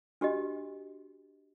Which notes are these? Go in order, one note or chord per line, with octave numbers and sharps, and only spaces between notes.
D4 F#4 G4 D#5